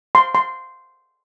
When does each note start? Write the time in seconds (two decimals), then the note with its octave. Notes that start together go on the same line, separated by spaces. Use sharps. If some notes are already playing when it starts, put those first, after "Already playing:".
0.15 C6
0.35 C6